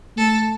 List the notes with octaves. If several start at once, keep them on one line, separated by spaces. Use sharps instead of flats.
A3 A4